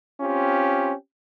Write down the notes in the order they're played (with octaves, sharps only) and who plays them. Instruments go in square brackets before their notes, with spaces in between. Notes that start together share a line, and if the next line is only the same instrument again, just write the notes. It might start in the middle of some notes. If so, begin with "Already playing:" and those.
[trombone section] C4 C#4 F4 G4